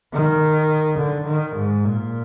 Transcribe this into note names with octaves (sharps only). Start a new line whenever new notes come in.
D#3
D3
D#3
G#2
A#2